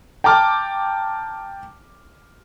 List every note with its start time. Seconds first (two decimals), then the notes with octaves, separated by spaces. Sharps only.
0.24 G5 A5 A#5 D6 F6